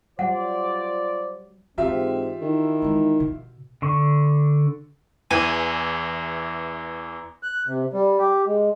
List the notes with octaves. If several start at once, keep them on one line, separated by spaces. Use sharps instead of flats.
F#3 G3 F4 C5 D5 F#5
G#2 E3 C4 F4 G4 E5
D#3 D#4 E4
E3 G#3
B2
D3 C#6
E2 E3 G#5
F#6
C3
G3
G4
G#3